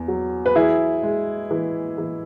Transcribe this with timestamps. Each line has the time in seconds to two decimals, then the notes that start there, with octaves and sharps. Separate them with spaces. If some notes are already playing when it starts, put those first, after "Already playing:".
Already playing: E2
0.08 F#3
0.46 B4
0.55 E3 E4 G#4
1.03 G#3
1.51 E3
1.98 E3